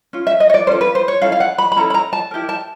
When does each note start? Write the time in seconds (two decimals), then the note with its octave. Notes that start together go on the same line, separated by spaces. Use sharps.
0.13 C#4 F4
0.27 E5
0.40 D#5
0.50 C#5
0.54 D5
0.67 C#4 F4 A4 C5
0.81 B4
0.95 C5
1.08 C#5
1.22 C#4 E4 A4 F5
1.32 F5
1.40 F#5
1.58 B5
1.72 B5
1.77 C#4 E4 A4 A#5
1.90 B5
1.94 A#5
2.13 A5
2.31 E4 G4 A#4
2.49 A5